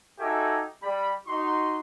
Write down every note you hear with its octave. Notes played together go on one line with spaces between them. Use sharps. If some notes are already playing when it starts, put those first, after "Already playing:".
D#4 F#4 G4 A4 E5 G#5
G3 B5
D#4 F#4 C6